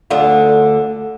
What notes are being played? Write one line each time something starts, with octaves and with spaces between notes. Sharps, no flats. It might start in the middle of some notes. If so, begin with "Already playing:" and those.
D2 D3 F4